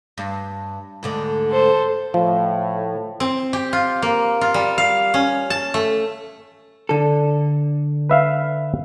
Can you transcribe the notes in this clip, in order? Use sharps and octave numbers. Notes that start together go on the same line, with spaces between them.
G2
D2 G#2 D3
A4 C5
A2 F3
C4
G4
F4
A#3
F4
G3
F5
C#4
A5
A3
D3 A4
B4 E5 F5